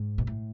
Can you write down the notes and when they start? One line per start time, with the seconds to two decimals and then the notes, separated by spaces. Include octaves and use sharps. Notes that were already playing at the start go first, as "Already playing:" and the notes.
Already playing: G#2
0.18 B2
0.27 A2